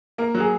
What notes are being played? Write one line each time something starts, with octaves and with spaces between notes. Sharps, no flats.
A#3 A#4
F#3
G#4